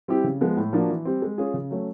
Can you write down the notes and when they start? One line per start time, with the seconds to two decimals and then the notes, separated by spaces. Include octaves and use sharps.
0.08 G3 C4 E4 G4
0.24 C#3
0.41 F3 G#3 B3
0.57 A2
0.73 F3 A#3 D4 F#4
0.90 E3
1.05 G3 C4
1.22 G#3
1.38 C#4 F4 G#4
1.54 C#3
1.71 F#3 A3 C#4